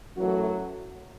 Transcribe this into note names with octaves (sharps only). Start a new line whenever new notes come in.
F#2 E3 F#3 A3 F#4